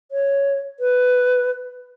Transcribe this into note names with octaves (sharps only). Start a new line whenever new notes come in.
C#5
B4